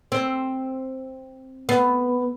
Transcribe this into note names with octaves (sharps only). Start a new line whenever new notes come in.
C4
B3